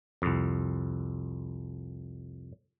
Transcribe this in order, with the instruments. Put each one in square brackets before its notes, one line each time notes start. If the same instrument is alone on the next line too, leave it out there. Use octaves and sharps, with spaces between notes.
[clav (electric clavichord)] C2 F2